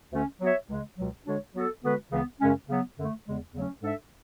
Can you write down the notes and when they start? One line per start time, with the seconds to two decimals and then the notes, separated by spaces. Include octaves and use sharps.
0.12 D2 D3 A3 C#4
0.41 F#3 B3 F#4 C#5 E5
0.69 C#2 C#3 G#3
0.97 C#2 B2 F#3
1.26 D3 G#3 D4 F#4 C#5
1.55 F#3 B3 F#4 A4
1.83 D3 G#3 B3 F#4 B4
2.11 C#2 C#3 E3 B3
2.40 F#2 C#3 G#3 C#4
2.69 C#3 F#3 B3
2.97 F#2 D3 A3
3.26 E2 C#3 G#3
3.54 E2 C#3 F#3 A3 C#4
3.82 G#2 G#3 D4 A4 E5